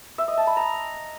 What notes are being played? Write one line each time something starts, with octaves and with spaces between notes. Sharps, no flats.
E5
D#5
A5
B5
A#5